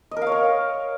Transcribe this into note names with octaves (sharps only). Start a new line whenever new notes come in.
D#5
A#4
F5
C#5
A#4